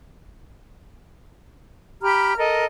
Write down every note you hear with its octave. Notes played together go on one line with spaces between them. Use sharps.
G4 A#5 B5 F6
A4 A#4 D#5